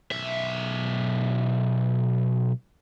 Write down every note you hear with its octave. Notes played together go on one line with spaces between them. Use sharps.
B1 E5